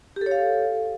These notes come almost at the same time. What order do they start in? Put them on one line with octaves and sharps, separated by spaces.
G4 A4 C#5 F5